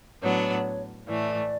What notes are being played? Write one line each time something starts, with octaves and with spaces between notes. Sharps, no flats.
A2 F#3 B3 D4 C#5
A2 E3 A3 D5